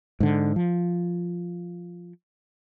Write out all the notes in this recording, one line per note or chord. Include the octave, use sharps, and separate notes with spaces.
G#2 D3
F3